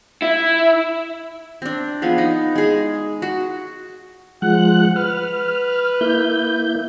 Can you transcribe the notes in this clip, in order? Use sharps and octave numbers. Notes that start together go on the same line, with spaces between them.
E4
C4 D4
F3 B3 G#4
D#4
G#3 G#4
F#4
F3 G#3 F#5 F#6
B4 F6
A#3 E4 G6